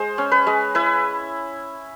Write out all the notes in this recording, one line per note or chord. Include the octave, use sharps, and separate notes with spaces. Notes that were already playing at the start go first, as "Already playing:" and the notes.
Already playing: G#3 C5
C#4
B4
G#3
E4 B4